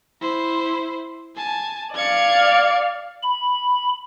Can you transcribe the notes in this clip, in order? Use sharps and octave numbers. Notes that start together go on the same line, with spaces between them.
E4 C5
G#5 A5
D5 F5 G#6 C#7
B5